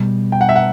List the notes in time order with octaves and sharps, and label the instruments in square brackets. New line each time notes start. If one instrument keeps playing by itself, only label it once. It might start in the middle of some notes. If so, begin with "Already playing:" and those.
Already playing: [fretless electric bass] B2 G3 B3
[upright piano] G5
F#5
E5
F#5